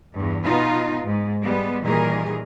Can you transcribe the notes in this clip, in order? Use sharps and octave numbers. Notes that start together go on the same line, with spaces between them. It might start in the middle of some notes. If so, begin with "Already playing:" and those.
E2 G2
B2 B3 D#4 F4
G#2
G3 G#3 B3
A#2 D#3 E3 G3 G#4 A#4